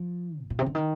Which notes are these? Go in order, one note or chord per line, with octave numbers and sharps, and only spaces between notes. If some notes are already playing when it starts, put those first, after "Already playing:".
Already playing: F3
G#2
A#2
C3
D3
D#3